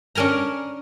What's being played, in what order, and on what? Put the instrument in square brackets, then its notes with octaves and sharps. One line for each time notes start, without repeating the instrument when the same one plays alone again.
[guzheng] C#4 D4 A#4 G#5 A#5